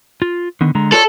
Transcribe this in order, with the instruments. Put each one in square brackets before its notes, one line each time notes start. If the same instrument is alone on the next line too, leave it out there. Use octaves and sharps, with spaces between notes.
[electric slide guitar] F4
D3 D#3 B3
D3 G#3 A#5
[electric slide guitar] F4 C#5 D5 [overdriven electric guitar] A4